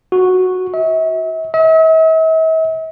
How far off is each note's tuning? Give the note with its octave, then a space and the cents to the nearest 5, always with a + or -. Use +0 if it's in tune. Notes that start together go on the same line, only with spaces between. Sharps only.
F#4 -5
E5 -40
E5 -45